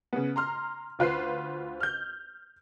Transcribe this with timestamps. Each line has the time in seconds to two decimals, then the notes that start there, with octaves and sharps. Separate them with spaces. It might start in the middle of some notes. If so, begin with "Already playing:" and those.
0.13 C#3 B3
0.36 A#5 C6 F6
0.99 D2 F4 B4 C5 C7
1.80 F6 G6